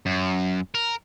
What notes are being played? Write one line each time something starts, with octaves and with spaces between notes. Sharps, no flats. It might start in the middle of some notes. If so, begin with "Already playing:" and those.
F#2
A#4